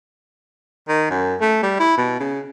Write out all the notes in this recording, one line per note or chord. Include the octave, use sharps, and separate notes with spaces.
D#3
F#2
A3
G3
E4
B2
C#3